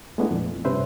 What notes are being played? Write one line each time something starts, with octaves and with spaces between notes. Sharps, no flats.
G#3 A3 B3 D4 E4
F2 A#2
G2 C3 C#4 B4 C5 E5